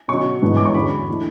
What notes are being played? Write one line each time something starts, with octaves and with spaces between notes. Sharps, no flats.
B2 F#3 C#4 C#6
G#2 E3 B3 D4
D6
C#6
E2 D3 F#3 C#4 B5
E3 A3 D4